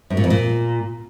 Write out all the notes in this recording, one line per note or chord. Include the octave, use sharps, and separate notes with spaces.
F#2
A#2
F2
A#2